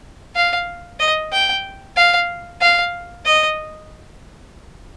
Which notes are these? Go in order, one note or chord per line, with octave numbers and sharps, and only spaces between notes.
F5
D#5
G5
F5
F5
D#5